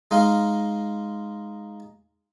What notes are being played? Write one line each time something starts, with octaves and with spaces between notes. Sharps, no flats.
G#3 D#4 F5